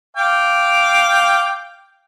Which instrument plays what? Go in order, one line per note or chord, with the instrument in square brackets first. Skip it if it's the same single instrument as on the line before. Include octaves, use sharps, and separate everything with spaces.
[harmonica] F5 G5 D6